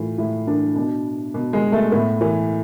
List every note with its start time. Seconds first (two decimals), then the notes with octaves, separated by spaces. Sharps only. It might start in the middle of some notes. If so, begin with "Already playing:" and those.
Already playing: A2 E3 F4
0.18 A2 E4
0.47 E3 D4
0.76 B2 D4
1.34 B2
1.53 G#3
1.72 A3
1.92 A2 B3
2.21 E3